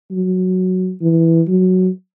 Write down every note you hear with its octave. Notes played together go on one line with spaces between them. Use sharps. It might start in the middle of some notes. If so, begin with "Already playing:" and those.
F#3
E3
F#3